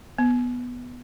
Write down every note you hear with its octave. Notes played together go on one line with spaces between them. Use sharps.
B3